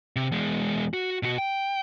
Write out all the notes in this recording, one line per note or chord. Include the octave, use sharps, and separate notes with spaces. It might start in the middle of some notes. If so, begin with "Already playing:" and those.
C3
E2 G#3
F#4
B2 F#4
G5